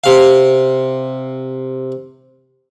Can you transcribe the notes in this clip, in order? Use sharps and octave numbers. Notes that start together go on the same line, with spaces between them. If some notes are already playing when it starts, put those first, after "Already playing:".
C3 F5